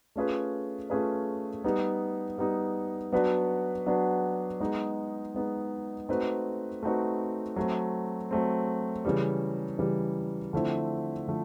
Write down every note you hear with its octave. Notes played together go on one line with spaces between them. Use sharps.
A3 C#4 F4 G#4 B4
A3 C#4 F4 G#4 B4
G3 B3 D#4
G3 B3 D#4
F#3 B3 D4 F#4 B4
F#3 B3 D4 F#4 B4
G#3 B3 D#4
G#3 B3 D#4
A3 C4 D#4 F#4 B4
A3 C4 D#4 F#4 B4
F#3 A3 C4
F#3 A3 C4
C#3 E3 G3
C#3 E3 G3
D3 F3 A3 C4 E4
D3 F3 A3